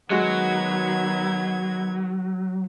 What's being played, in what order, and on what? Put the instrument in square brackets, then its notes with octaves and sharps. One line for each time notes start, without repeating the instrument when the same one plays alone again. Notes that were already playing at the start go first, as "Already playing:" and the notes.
[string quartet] D#3 B3 G#6 [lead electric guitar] F#3 [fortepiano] G#3 F#4